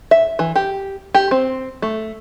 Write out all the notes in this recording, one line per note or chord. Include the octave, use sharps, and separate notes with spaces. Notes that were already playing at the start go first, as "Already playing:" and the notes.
E5
E3
G4
G4
C4
A3